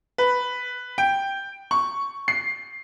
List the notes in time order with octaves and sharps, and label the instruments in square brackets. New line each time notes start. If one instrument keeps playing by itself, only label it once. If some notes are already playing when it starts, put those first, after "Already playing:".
[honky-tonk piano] B4
G5
C#6
C7